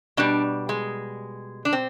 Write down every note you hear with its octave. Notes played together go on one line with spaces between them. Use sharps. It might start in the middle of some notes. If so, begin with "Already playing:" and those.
B2 G3 D4
G#3
D4
C4